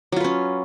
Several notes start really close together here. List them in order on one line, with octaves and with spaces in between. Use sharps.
F#3 F4 B4 C#4